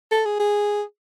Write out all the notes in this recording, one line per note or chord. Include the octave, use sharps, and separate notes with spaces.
A4
G#4
G#4